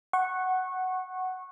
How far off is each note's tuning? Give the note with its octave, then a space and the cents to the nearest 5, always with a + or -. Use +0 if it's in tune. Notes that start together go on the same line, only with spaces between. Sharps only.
F#5 +5 C#6 -20